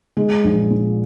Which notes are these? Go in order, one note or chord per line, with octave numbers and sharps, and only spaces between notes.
G#3
A#1
A#2